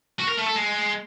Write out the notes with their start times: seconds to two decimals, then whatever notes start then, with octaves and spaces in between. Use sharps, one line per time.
0.20 F#4
0.29 A#4
0.38 A3
0.46 A4
0.55 G#3